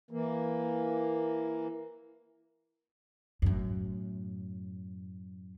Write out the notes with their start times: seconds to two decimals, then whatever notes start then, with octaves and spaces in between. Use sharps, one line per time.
0.11 E3 A#3
3.42 F#2 A2